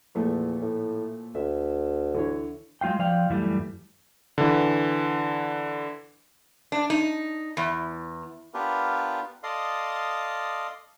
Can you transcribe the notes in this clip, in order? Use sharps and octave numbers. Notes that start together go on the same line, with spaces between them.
E2 A#2 F3 A3
A2
D2 E5
D3 E3 C#5
F#3 G#3 F4 F5 G5
F3 D5 F5 G5
F#2 E3 G3 A3
D3 E3
D4
D#4
E2
B3 D4 F4 G4 A#4 B4
A4 D5 D#5 F5 C6 D#6